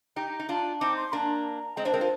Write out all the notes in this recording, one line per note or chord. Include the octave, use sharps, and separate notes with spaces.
D#4 G4 A#5
D#4
D4 F4
C4 D#4 D6
C6
A#3 D4 A#5
G#3 C4 D#5
A#3 D4 C5
G#3 C4 A#4
F4 C5